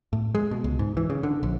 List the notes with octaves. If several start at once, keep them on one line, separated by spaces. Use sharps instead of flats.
A2
G#3
B2
C#2
G#2
E3
C#3
D3
A#1